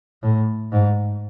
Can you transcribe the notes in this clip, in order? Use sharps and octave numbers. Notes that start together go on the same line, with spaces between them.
A2
G#2